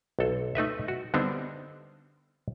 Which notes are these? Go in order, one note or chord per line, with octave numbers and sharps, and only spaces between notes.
B1 A4
A3 D#4 B4 E5
F#4
D3 G3 B3 C4 D4 D#4